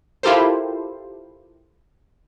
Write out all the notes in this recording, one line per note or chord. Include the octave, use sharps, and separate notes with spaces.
E4 F4 G4 A4 A#4 C5